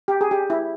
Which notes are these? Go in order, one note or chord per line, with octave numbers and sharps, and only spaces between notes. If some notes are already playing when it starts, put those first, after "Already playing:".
G4
G#4
G4
E4